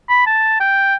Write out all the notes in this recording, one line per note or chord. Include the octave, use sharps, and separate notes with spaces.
B5
A5
G5